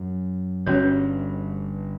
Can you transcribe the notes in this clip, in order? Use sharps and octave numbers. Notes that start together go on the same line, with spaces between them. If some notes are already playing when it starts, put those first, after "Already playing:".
Already playing: F#2
G1 G2 C#4 F#4 C#5